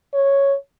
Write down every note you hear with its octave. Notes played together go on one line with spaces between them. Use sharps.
C#5